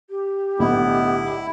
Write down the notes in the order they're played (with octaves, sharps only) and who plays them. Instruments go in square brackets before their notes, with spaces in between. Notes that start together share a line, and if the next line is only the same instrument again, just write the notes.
[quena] G4
[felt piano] B1 A2 D3 [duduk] B3 [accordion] E4